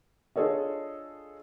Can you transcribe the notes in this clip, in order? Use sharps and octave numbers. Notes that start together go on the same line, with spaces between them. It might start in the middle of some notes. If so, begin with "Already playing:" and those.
D4 F4 G#4 A4 C#5 D#5